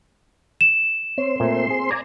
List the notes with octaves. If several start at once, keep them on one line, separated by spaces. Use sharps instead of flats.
E7
C4 C#5 C6
A#2 A3
G#4
D5 G#5 A#5